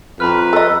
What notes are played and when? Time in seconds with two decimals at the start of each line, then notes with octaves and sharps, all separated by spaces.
0.20 F2 B4 A#5 B5 F6
0.53 A4 D#5